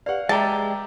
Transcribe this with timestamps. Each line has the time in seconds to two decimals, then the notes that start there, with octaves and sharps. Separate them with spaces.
0.06 G4 B4 D5 F5 F#5
0.29 G#3 G4 G#4 D5 E5 A5 A#5